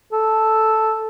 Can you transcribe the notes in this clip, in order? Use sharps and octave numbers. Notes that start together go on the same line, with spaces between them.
A4